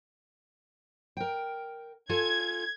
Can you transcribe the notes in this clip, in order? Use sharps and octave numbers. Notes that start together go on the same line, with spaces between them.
A#4 G5
F4 A4 G#5 G#6